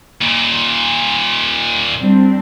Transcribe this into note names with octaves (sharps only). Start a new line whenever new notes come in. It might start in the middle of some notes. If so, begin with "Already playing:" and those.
D#2 A#2
G3 C4 D4